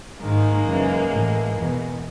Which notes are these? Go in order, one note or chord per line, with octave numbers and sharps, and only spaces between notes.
G#2 D#3 G#3 A#3
F#2 C#3 E3
A2 E3
E2 B2